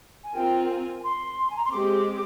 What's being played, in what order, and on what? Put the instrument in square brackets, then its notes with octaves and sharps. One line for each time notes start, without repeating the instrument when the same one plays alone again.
[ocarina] G#5
[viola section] C4 F4 A#4 [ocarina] G5
[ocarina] G#5
C6
G#5
A#5
C6
[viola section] G#3 C4 G4 [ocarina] D6